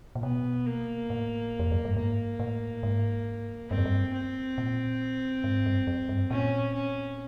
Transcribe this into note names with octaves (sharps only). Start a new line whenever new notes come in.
A#2
B2 B3
A#3
A2
F2
F#2
G2
G#2 A#3
A2
G#2
G2 C4
F#2
G2
C4
A#2
G#2
G2
F#2
G2
A#2 C#4
C#4